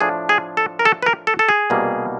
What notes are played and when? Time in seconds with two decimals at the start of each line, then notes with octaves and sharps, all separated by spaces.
0.01 A2 F3 A3 D4 G#4
0.29 G#4
0.57 A4
0.79 A#4
0.85 A4
1.02 B4
1.06 A#4
1.27 A4
1.39 A4
1.49 G#4
1.70 C2 B2 G3 A#3 D4